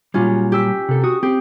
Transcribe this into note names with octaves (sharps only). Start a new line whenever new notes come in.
A#2 F#3 G3 C#4 F4
G4 E6 B6
C3 A4
F#4 D#6
C4 G4